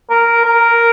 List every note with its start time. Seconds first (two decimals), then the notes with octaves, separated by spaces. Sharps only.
0.10 A#4
0.45 A#4